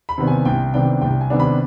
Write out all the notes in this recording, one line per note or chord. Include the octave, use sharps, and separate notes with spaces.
B5
C3 D#3 B3 D4
G#5
C2 G5
C3 D#3 B3 D4 G5
C2 G5
G#5
C3 D#3 B3 D4
B5